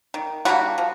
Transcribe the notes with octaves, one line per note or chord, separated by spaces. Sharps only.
D#3
G3 A#3 D4 F#4
F3